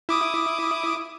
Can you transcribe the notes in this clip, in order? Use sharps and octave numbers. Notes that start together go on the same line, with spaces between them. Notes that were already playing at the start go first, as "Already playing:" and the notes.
E4 D6 D#6